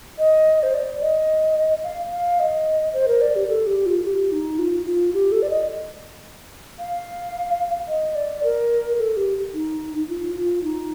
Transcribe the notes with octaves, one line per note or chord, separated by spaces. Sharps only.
D#5
C5
D5
D#5
F5
F5
D#5
C5
A#4
D5
G4
A4
G4
F4
G4
D#4
F4
F4
G4
A4
D5
D#5
F5
D#5
D5
A#4
A4
G4
D#4
F4
F4
D#4